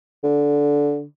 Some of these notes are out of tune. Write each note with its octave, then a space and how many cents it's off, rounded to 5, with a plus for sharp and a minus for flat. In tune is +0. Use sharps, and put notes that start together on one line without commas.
D3 -15